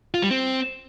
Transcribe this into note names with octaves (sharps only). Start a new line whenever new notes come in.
F4
G3
C4